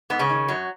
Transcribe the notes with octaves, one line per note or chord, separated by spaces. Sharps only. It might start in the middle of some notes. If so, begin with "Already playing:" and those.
G#2 B3
C#3 C#4
D#3
F#2 F#3